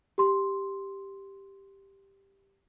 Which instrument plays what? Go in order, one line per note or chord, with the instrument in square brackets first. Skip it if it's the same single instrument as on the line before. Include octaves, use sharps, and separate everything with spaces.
[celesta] G4 C6